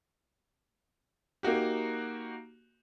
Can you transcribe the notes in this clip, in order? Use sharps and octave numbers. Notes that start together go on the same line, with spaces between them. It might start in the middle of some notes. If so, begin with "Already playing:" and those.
A#3 D#4 F#4 G4